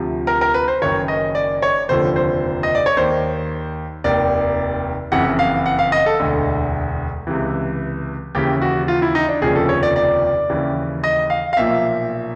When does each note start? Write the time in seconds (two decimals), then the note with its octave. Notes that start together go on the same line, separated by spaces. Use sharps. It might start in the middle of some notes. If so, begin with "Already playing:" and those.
Already playing: D2 C3 F3
0.27 A#4
0.41 A#4
0.54 B4
0.68 C5
0.82 F#1 F#2 D#3 C#5
1.08 D#5
1.35 D5
1.62 C#5
1.89 F1 D#2 D3 F3 C5
2.16 C5
2.63 D#5
2.75 D5
2.86 C#5
2.97 D#2 D#3 C5
4.04 F1 D#2 D#3 D5
5.12 F#1 F2 C#3 E3 F#5
5.39 F5
5.66 F#5
5.79 F5
5.92 D#5
6.06 A4
6.20 E1 D2 D3
7.27 C#2 C3 E3
8.35 D#2 C#3 E3 G4
8.62 F#4
8.88 F4
9.02 E4
9.15 D#4
9.29 D4
9.42 F1 D#2 C#3 F3 G#4
9.56 A4
9.69 C#5
9.83 D5
9.96 D5
10.50 D#2 C#3 E3
11.04 D#5
11.30 F5
11.53 F5
11.57 B1 A#2 F3 E5